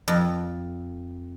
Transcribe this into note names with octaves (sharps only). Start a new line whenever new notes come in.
F2